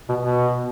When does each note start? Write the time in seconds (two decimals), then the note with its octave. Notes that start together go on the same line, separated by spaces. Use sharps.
0.09 B2
0.19 B2